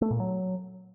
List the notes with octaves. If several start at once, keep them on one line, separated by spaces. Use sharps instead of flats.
A3
A#2
F#3